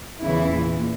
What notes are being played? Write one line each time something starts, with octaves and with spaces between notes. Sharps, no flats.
E2 C#3 E3 E4
A#2